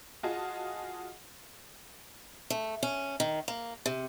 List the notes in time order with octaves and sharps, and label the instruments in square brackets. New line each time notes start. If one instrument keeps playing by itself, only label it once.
[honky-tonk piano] F4 F#4 G#4 D#5 A5
[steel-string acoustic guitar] A3
C#4
D#3
A#3
C3